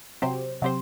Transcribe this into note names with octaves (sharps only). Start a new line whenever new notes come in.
C3 F#3 C4 G4 C5
C3 F#3 C4 G4 C5